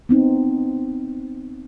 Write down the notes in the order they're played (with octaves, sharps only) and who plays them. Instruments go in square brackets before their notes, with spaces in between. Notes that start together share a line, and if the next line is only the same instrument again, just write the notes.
[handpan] B3 C4 D#4